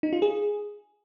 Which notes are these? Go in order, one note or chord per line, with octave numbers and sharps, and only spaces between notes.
D#4
F4
G#4